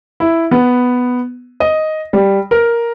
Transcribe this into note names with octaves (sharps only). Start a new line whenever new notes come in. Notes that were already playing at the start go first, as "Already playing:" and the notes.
E4
B3
D#5
G3
A#4